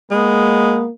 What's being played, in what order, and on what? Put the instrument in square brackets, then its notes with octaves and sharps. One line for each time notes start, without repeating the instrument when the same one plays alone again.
[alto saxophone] G#3 [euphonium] A#3 [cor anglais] B3